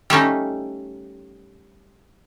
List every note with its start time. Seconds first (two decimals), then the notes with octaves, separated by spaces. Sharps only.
0.10 G3 A3 C#4 D#4